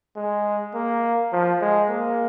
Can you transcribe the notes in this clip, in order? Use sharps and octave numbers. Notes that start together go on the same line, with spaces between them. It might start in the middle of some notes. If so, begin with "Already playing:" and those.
G#3
A#3
F3
G#3
A#3